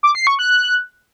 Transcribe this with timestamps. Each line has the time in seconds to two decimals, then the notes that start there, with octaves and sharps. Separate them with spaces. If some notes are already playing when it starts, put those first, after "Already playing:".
0.03 D6
0.15 C7
0.27 C#6
0.39 F#6